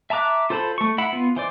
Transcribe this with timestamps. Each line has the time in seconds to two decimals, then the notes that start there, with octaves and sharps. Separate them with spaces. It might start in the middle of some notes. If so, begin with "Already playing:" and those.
0.10 E5 A5 A#5 D6 F#6
0.50 F4 A4 C5 A5 B5
0.78 A3 C#6
0.98 E4 F#5 B5
1.12 B3 F4
1.36 E3 C5 D5